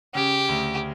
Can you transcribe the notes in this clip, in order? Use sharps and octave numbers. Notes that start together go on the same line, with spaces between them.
C#3 G4
D2